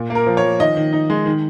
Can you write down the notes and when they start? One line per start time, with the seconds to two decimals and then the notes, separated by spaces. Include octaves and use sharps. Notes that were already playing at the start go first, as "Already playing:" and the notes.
Already playing: A#2
0.10 A#3
0.15 A#4
0.27 F3
0.37 C#5
0.43 F3
0.60 D#3 D#5
0.77 D#3
0.93 D#4
1.10 G#3
1.26 D#3